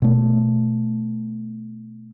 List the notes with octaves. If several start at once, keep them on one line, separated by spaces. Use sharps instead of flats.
B2 A3